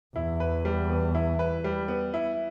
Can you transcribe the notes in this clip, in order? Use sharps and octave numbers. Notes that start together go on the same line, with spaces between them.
E2 E4
B4
G3
B3
E4
B4
G3
B3
E4